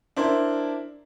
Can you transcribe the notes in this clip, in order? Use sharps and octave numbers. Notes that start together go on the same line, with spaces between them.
D4 E4 A#4 C5